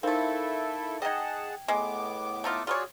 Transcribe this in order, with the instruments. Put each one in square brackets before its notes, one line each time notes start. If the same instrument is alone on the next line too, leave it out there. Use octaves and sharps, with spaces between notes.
[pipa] A3 C4 [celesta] D#4 A#4 F5 [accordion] E4 A4
[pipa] D#4 D#5 [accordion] G#4 F#5 A5 [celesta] G5 G#6
[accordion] A2 B3 D6 [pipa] G#3
[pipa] A3 D#4 F4
[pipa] F4 B4 C#5 [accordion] F#4 G#4 D5